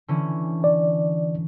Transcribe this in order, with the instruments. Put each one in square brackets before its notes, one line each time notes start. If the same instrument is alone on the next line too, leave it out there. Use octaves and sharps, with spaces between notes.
[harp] D3 E3 C#4
[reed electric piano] D5